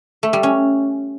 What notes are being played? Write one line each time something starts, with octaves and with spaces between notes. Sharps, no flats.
A3
G3
C#4